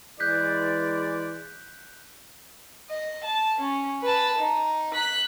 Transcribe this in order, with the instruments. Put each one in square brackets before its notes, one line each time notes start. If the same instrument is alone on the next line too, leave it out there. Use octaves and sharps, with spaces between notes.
[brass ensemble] E3 G#3 D5 [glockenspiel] F#6 G6 B6
[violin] D#5
A5
C#4
B4 A5
D#4
F#6 B6